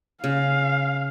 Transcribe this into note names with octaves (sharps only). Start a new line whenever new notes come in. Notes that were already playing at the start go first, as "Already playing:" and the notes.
C#3 F5